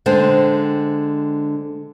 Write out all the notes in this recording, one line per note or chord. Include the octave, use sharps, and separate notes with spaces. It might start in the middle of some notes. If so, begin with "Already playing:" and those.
D3 G#3 C5 G5